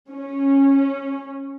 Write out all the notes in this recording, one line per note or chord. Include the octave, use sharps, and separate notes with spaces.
C#4